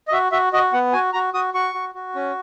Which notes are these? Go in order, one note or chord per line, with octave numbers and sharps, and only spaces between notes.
D#5
F#4 E5
F#4 E5
F#4 D#5
B3 F#5
F#4 G#5
F#4 A#5
F#4 D#6
F#4 C#6
F#4
F#4
C#4